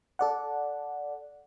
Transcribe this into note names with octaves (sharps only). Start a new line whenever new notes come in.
A4 D5 F#5